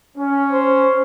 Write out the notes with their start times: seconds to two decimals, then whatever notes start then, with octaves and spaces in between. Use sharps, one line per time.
0.18 C#4
0.52 C5